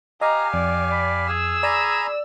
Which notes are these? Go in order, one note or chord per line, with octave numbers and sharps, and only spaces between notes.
G4 D#5 F5 G#5 A#5
F2 D5
B5
G#4 E6
D5 G#5 A#5 B5